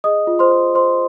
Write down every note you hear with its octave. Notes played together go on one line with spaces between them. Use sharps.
G#4 D#5 D#6
F4
C5 C6
C5
C5 C6